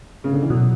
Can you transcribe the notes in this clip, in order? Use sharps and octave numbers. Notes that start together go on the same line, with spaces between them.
C#3
D3
E3
B2 F#3